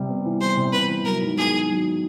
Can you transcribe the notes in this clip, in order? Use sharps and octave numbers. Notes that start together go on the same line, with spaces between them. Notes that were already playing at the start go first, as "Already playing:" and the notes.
Already playing: C3 G3
B3
E3
G3 C5
C3
B3 B4
E3
F#3 A#4
G#2
B3 G#4
D#3
F#3